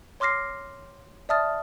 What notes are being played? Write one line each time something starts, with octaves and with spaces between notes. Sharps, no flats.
C#5 C6 D6 F6 A#6 C7
D5 E5 A5 D#6 F6 A6